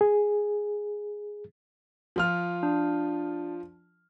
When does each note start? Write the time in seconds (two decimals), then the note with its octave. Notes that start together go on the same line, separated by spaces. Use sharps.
0.01 G#4
2.16 F3 F4 F6
2.63 D4